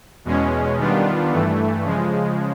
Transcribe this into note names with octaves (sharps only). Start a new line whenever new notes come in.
E2 B2 G#3 C#4
D#3 G3 B3 D4 F4
G2 E3 A3
C#3 F3 G#3